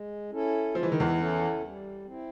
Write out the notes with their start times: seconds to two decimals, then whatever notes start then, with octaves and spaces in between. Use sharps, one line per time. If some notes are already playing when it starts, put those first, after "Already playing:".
Already playing: G#3
0.32 C#4 E4 A4
0.75 F3 G#3
0.83 E3
0.92 D#3
1.00 E2 E3
1.18 C#4 E4 A4
1.63 G3
2.05 C4
2.10 E4